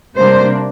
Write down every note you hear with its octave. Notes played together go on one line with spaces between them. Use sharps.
C3 G3 A#3 D4 C5